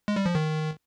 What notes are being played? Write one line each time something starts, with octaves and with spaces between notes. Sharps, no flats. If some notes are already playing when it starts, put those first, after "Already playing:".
G#3
G3
F3
D#3